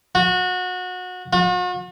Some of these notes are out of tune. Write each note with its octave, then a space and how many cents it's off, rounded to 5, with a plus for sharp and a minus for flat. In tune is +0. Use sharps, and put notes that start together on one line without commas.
F#4 -25
F#4 -45